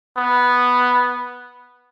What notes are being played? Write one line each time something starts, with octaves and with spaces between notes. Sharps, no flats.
B3